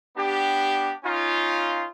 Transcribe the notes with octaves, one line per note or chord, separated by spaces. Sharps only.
B3 D4 G4
C#4 D#4 F4